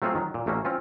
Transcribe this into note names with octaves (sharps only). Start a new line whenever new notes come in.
F#3 A3 C4 F4 F#4 G#4
D#3 F#3
A#2
A1 A3 A#3 C#4 F#4
C4 C#4 F4